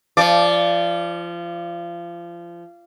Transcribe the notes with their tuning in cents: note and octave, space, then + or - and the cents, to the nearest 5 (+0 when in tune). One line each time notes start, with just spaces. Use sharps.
F3 -25 D5 +0